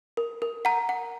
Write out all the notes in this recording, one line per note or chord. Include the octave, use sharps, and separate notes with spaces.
A#4
A#4
F#5 A#5
F#5